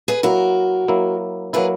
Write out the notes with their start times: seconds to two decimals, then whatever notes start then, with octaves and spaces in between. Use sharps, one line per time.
0.08 G#4 B4
0.23 F#3 A#3 E4 F#4 A#4
0.88 F#3 A#3 E4
1.53 F#3 A#3 E4 G#4 B4